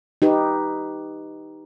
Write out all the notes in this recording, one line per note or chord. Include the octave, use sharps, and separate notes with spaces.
D#4 G4 B4